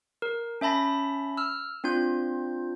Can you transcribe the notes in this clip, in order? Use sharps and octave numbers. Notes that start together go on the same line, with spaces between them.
A#4
C#4 E5 A5 B5 A#6
E6 F6
C4 D4 F4 G6